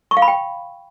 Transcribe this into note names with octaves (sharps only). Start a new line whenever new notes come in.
C#6
F5
B5
G5